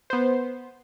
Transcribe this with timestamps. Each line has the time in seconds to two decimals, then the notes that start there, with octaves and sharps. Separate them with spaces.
0.10 B3 C5